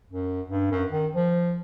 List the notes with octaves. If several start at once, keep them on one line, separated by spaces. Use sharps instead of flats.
F#2
G2
F#2
D#3
F3